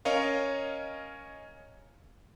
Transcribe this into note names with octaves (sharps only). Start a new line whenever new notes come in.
C#4 A#4 C#5 D#5 F5